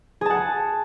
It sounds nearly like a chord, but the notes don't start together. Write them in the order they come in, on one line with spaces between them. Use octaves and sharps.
G#4 A5 F#5